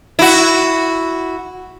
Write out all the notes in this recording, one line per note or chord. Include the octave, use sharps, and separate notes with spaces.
E4 F#4